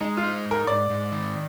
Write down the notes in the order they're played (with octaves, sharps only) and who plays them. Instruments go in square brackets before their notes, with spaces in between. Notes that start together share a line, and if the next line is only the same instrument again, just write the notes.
[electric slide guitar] G#3 [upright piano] D#4
[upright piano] F4
[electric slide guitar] D#4
G#2
[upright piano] A#4
[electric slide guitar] G#2 [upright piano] D5
[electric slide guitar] G#2
D#3